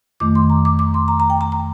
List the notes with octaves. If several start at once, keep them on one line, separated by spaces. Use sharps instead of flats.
F2 D#3 A3 D6
C6
A#5
D6
D6
C6
A#5
A#5
G5
A#5
A#5